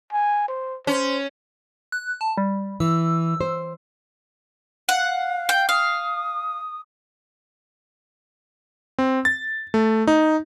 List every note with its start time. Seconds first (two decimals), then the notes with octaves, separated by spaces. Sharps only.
0.13 G#5
0.48 C5
0.87 C#4 C5
1.92 F#6
2.21 A5
2.38 G3
2.80 E3 E6
3.41 C5
4.89 F5 F#5
5.49 G5
5.69 F5 D#6
8.99 C4
9.25 A6
9.74 A3
10.07 D#4